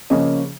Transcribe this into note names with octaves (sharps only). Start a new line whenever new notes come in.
C#3 F3 A#3 C#4 D#5